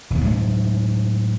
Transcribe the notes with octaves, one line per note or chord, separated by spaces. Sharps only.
E1 D#2
A2 F#3 G#3